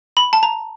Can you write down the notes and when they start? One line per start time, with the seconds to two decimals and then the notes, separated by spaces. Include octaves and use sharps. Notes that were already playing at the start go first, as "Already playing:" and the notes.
0.17 B5
0.33 A5
0.43 A#5